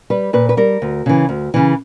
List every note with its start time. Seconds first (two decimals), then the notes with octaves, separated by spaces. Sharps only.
0.10 G3 B4
0.33 A#2 B4
0.49 B4
0.57 G3 A#4
0.82 D2
1.06 C#3 E3
1.29 D2
1.54 C#3 E3